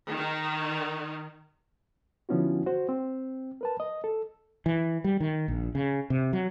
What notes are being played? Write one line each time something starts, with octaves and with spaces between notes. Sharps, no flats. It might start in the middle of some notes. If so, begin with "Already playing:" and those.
D#3
D3 F3 B3 C#4 E4 F#4
F#4 C5
C4
A#4 B4 A5
D#5
A4
E3
G3
D#3
A#1
C#3
C3
F#3